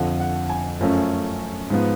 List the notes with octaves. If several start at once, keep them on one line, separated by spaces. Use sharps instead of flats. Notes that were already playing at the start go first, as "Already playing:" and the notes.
Already playing: F2 D3 F3 F#5
F#5
G#5
F#2 F3 A3 C#4
G#2 F3 B3